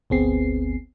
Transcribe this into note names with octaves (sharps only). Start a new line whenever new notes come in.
G1 D2 B3 C4 G#4 C7